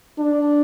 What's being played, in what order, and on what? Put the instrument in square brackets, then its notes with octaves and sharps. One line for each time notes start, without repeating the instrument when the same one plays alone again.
[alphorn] D4